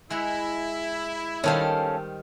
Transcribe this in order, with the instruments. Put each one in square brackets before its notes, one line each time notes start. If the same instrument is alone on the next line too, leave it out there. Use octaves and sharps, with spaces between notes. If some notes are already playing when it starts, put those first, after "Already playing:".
[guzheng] G#3 E5 F#5 [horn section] E4
[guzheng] D#3 G3 C5 [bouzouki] C#4 A4 F5